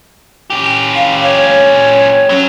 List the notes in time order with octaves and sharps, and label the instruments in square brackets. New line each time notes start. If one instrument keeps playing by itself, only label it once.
[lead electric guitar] C#4 G4
[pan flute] F5
C#5
[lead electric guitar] F#3 [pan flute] C#4